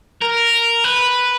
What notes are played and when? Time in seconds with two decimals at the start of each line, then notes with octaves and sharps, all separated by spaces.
0.21 A#4
0.84 B4